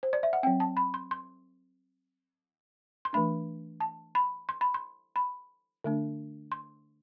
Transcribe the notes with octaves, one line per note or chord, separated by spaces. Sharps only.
C5
D5
E5
F#5
F#3 C4 G5
A5
B5
C6
C6
C6
E3 A3 D4 B5
A5
B5
C6
B5
C6
B5
D3 A3 D4
C6